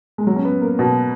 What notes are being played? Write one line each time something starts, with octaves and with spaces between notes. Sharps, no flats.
G#3
F#3
C#4
B3
A#3
B2